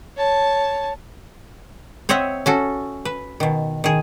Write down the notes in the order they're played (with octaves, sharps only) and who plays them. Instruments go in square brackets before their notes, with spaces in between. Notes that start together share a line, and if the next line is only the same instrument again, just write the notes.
[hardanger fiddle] C#5 A5
[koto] C4 C#5 D#5 E5 F#5
C#4 F#4 A4
B4
B2 D#3
D#3 G#4